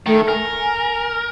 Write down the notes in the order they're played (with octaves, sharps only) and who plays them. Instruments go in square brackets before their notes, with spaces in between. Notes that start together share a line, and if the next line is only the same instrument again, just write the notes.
[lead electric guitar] D#3 [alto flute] A3
[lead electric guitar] A#4 [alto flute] G#5